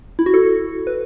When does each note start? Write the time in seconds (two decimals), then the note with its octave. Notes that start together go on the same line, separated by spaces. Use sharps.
0.19 E4
0.26 F#4
0.34 A4
0.87 B4